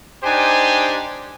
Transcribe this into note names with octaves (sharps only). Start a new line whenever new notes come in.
D4 D#4 G4 C5 G#5